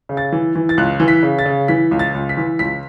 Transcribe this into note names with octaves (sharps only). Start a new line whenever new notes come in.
C#3
A6
E3
E3
A6
C#2 F#6
E3
B6
C#3
A6
C#3
E3 B6
C#2
A6
C#2
B6
E3
C#2 B6